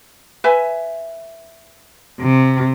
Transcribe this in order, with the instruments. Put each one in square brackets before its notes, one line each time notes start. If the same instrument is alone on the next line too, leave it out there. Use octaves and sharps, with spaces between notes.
[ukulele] B4 E5 G#5
[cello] C3